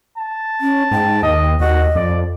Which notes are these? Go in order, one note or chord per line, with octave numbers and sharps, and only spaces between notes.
A5
C#4
G#2 G5
D#2 D#5
D#2 F#4 D#5
F2 D5